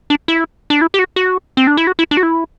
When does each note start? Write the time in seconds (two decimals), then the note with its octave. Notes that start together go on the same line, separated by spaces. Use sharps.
0.10 D4
0.28 E4
0.70 D4
0.81 E4
0.94 G4
0.99 F#4
1.16 F#4
1.57 C4
1.67 D4
1.77 E4
1.87 F#4
1.99 E4
2.11 D4
2.17 F#4
2.23 E4